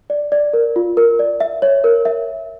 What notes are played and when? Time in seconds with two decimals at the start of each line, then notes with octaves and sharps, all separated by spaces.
0.10 D5
0.32 D5
0.53 A#4
0.76 F4
0.97 A#4
1.19 D5
1.40 E5
1.62 C#5
1.84 A#4
2.05 E5